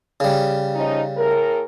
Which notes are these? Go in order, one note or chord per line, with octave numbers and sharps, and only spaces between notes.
C#3 G3
F3 C#4 D#4
A2 G#4 A#4